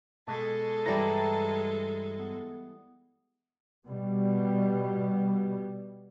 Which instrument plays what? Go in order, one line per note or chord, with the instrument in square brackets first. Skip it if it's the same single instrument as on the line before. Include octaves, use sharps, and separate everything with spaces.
[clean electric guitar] B2 [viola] G#3 A4 [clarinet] A5
[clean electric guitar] G2 A#5 [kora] E3 G3 E4
[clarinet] B3
[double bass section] B2 G3